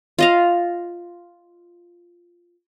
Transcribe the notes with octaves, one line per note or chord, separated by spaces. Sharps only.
F4 D#5 F5